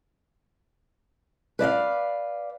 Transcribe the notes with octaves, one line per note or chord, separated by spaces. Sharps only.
B4 D5 E5 F5